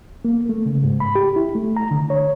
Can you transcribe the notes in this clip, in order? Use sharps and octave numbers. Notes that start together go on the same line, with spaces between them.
A#3
A3
C#3
G#2
B5
G4
E4
A3
A#5
D3
C#5